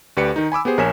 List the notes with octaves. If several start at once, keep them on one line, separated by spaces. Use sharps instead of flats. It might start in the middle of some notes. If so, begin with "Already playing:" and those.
D2 G4 B4 D5 C#7
D#3 D#4
G#5 B5 D6 E6
B3 G4 G#4 C5
A#1 A#4 C#5 G#5 B6 E7